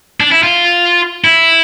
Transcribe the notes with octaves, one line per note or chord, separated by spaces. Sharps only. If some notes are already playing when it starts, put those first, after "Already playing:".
D4
E4
F4
E4